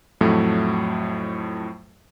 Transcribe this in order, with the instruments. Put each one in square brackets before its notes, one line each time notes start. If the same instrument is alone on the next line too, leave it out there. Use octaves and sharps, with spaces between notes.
[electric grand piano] F2 A2 F#3 A3